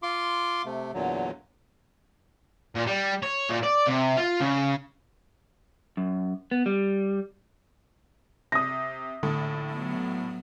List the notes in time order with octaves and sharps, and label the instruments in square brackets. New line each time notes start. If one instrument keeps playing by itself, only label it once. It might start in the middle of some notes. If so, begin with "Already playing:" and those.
[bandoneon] F4 C6 D6
C3 A3
E2 A#2 D3 F#3
[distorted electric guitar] A#2
G3
C#5
A#2
D5
C3
F4
C#3
[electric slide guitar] F#2
B3
G3
[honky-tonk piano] C3 [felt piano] D#6 A#6
[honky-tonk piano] A#1 A2 A4 [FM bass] D3
[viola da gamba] F#3 B3